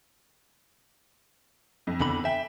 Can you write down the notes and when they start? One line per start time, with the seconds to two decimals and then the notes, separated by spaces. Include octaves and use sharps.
1.87 F2
2.00 E2 D3 B5
2.25 E5 G5